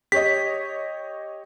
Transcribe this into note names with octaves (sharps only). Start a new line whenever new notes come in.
G4 C#5 D#5 B6